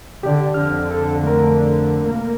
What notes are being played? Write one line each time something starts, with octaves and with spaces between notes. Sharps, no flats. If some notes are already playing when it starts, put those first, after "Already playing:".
D3 G4 D5
F2 D3 F6
A4
A3 A#4
B2 A#3